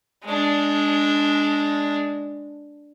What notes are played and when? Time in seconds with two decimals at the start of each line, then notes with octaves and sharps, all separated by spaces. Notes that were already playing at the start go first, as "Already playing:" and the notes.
0.25 G#3 D4